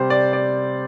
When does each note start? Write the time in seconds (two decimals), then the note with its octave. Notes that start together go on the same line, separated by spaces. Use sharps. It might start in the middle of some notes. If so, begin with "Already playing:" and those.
Already playing: C3 G3 C5
0.10 D5
0.33 D5